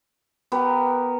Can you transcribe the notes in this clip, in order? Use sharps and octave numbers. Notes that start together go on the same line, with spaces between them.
B3 G4 A#4